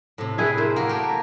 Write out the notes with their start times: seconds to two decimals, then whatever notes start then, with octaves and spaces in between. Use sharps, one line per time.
0.18 A2 C3
0.38 E4 G#4 B4
0.57 A#4 C5
0.76 A#3 F#4
0.89 A3 G4